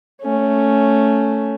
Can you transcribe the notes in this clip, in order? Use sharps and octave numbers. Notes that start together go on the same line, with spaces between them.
A3 C#4